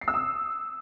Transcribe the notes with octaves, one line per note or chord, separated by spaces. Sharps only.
C7
E6
D#6